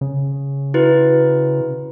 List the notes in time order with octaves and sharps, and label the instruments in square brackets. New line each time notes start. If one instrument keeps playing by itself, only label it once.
[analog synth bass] C#3
[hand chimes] E4 F#4 B4